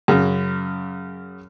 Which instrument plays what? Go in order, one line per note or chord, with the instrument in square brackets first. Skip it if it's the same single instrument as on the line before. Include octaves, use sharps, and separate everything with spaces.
[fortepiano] F#2 C#3